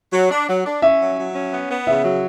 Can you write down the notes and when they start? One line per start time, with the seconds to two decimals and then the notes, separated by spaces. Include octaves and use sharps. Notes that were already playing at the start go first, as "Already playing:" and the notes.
0.13 F#3
0.31 D4
0.48 F#3
0.65 D4
0.82 C#4 E5
1.00 F#3
1.17 F#3
1.35 C#4
1.53 B3
1.70 B3
1.87 C#3 E5
2.04 F#3